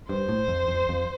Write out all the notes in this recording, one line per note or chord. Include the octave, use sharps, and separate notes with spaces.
G2 C5
A2
F2
F2
F2